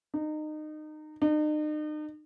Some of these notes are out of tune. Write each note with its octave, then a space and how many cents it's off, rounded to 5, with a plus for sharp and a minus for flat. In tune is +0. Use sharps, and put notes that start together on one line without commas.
D#4 -25
D#4 -40